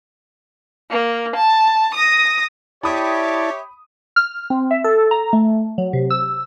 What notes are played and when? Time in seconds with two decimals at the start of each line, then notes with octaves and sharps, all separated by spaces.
0.91 A#3
1.36 A5
1.95 D#6 A#6
2.84 E4 G4 C#5 D5 E5 A5 B5 D#6
4.16 F6
4.50 C4
4.71 E5
4.84 A4
5.11 A#5
5.33 A3
5.78 F#3
5.93 C3
6.10 E6